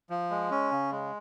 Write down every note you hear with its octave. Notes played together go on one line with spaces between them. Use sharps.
F3
G#3
C#4
C#3
G#3